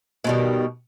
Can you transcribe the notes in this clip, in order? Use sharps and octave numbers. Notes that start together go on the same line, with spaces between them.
B2 D#3 G3